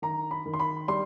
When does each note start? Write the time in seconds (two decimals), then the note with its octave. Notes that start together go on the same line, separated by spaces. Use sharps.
0.02 D#3 A#5
0.31 B5
0.46 D#3
0.54 C6
0.60 B5
0.88 G3 C6